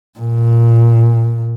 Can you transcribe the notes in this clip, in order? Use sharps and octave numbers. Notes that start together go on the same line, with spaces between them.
A#2